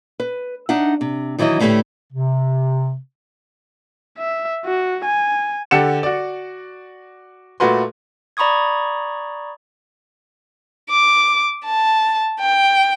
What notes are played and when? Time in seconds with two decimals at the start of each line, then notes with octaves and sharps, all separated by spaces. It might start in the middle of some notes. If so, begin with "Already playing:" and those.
0.20 B4
0.69 D4 D#4 E5 F#5
1.01 C3
1.38 D#3 E3 F#3 E4 D#5
1.60 D2 A2 A3 B3 G4 B4
2.13 C3
4.18 E5
4.65 F#4
5.04 G#5
5.71 D3 G4 A4 F#5 C#7 E7
6.03 F#4 D5
7.60 A#2 A3 F#4 B4 C6
8.37 D5 A#5 B5 C#6 D#6 G#6
10.90 D6
11.65 A5
12.40 G5